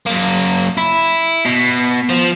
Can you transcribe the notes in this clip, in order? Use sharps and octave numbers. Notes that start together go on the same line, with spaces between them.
F#2 A#3
E4
B2
F3